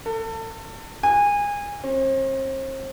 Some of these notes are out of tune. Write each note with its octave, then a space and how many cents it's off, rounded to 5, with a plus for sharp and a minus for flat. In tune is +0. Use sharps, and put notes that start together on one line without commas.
A4 +30
G#5 -25
C4 +40